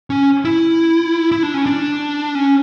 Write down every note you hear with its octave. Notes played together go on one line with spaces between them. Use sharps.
C#4
E4
E4
D4
C#4
D4
C#4